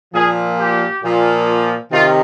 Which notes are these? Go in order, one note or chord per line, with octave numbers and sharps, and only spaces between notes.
A#2 F3 G#4
G4
A#2 F3
C3 D#3 F4